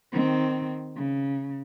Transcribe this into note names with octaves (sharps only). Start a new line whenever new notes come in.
D#3 C4
C#3